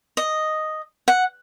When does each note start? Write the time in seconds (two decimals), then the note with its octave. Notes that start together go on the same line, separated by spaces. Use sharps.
0.17 D#5
1.08 F#5